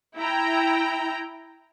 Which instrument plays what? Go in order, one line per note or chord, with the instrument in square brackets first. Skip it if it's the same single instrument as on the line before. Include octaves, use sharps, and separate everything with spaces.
[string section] E4 G5 A#5